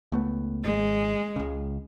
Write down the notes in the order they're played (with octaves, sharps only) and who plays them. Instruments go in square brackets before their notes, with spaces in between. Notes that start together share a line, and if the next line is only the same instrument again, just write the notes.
[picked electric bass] C#2 A3 B3
[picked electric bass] G#1 [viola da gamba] G#3
[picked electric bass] C#2 C#3